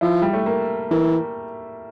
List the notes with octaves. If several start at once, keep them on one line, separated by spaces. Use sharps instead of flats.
F3 E4
G3
A3
A#3
E3 A#3